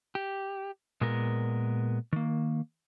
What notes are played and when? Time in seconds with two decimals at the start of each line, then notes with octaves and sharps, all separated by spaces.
0.15 G4
1.01 A#2 G#3 B3 A#4
2.13 D#3 A#3